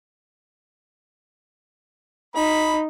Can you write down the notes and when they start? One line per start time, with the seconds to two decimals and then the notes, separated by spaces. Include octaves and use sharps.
2.35 D#4 B5